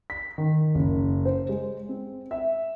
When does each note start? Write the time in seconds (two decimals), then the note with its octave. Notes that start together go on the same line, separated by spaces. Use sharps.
0.10 B6
0.38 D#3
0.75 F#1
1.25 C5
1.49 G#3
1.89 C4
2.31 E5